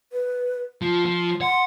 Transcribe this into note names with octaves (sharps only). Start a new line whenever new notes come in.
B4
F3 F4
F3
F#5 C6